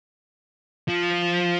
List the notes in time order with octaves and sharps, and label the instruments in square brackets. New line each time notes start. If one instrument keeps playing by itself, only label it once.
[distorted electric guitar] F3